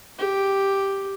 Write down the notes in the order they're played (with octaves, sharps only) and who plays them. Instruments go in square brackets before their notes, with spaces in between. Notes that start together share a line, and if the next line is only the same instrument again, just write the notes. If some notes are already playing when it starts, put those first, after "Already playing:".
[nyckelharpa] G4